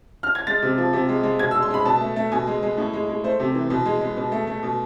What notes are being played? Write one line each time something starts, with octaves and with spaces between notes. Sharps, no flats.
F6
G#6
G#3 A6
C3
F3
C3
G#3
G#3
B2 G#6
E6
G#3
C6
G#3 B5
B2 A5
A3
A3
B2 G#5
G#3
G#3
A2
G#3
G#3
A3 C5
C3
E3
B2
G#3
G#3
B2
A3
A3
B2